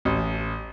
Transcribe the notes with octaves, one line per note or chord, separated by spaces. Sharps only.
A1